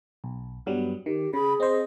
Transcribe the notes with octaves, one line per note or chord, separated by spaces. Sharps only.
B1
G2 F#3 G3 B3
D#3 G4
C#3 G#4 B5
C4 C5 D#5